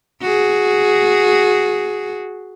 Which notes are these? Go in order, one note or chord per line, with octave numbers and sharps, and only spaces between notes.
F#4 G#4